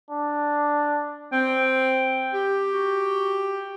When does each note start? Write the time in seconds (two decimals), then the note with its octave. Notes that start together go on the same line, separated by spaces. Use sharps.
0.11 D4
1.32 C4 G5
2.34 G4
2.73 F#4